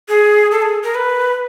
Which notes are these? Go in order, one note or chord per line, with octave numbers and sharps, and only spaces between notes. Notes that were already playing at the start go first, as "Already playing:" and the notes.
G#4
A4
G#4
A#4
B4